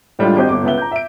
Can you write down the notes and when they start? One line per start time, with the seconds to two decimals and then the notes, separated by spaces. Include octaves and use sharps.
0.19 A2 G3 G#3 D4 F4
0.36 G#1 G4 C5 D#5 G6
0.49 G1 D6
0.63 C#2 B3 E5 G7
0.78 A#5 G6
0.92 E5 D7